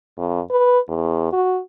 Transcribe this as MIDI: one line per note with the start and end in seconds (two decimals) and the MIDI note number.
0.18 0.40 41
0.50 0.79 71
0.88 1.32 40
1.33 1.60 66